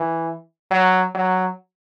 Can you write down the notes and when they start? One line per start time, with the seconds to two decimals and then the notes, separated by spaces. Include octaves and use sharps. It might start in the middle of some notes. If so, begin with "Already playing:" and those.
Already playing: E3
0.71 F#3
1.15 F#3